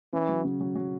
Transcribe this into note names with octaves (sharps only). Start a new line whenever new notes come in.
E3 C#4
F#3
C#3
F#3
F#3